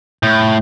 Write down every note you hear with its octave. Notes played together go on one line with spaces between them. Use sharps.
A2